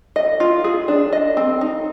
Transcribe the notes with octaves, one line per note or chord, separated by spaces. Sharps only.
D#5
F4
G#4
D4
D#5
C4
D#4